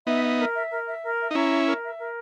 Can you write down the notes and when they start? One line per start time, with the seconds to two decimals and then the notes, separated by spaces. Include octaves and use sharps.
0.06 B3 D#4 E5
0.23 E5
0.38 A#4
0.54 E5
0.71 A#4
0.87 E5
1.03 A#4
1.19 E5
1.31 D#4
1.35 C#4 E4 A#5
1.51 E5
1.67 A#4
1.83 E5
2.00 A#4